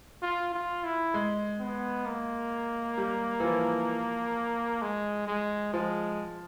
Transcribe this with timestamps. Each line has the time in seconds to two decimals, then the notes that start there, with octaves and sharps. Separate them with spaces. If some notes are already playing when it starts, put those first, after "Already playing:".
0.22 F4
0.54 F4
0.84 E4
1.14 G#3
1.60 B3
2.06 A#3
2.98 G3
3.40 E3
3.44 F3
4.82 G#3
5.28 G#3
5.73 F3 G#3